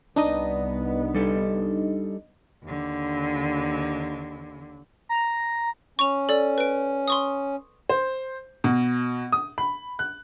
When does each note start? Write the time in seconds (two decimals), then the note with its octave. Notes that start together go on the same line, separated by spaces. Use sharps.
0.16 C2 B3 D4 D#4 D#5
1.15 G3 A4
2.63 D#2 D3
5.09 A#5
5.99 C#4 C#6 F7
6.29 A4 D5
6.58 B4 D7
7.08 C6 C#6 D#6
7.90 C5
8.64 B2
9.32 D#6
9.58 B5
9.99 F#6